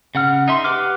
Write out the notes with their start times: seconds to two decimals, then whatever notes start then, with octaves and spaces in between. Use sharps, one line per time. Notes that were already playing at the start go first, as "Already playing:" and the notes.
0.15 C#3 F#5 F6
0.48 D#4 E5 C6
0.64 G4 B4 F#5 D6 F6